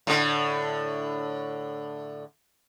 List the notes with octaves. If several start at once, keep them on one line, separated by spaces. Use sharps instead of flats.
A2 D3